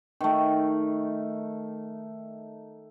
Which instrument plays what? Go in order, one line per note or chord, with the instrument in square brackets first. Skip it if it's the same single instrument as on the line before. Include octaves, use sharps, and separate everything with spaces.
[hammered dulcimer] D#3 A3